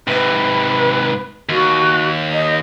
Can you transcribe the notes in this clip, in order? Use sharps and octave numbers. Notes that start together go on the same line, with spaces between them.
G#2 C3 B4
D#2 F#4
D#5